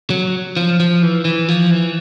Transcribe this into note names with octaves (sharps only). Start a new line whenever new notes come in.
F#3
F3
F3
E3
E3
F3
E3